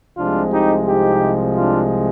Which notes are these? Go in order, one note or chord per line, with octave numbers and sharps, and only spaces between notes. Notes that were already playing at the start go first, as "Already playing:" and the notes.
C2 C3 F3 G#3 D4 F4
D#4 G4
D#4 G4
D4 F4